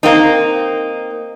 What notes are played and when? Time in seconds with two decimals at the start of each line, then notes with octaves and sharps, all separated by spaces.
0.03 A#3 C4 D#4